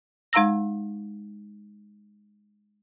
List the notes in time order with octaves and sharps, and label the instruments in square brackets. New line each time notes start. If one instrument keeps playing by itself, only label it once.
[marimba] G#3 D#4 F5 A#5 E6 A#6